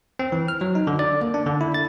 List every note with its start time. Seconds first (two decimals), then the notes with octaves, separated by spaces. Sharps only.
0.19 C4
0.32 E3
0.48 F6
0.61 F#3
0.75 D#4
0.87 D3
0.99 D5
1.21 A#3
1.34 D4
1.47 D3
1.61 E4
1.74 A6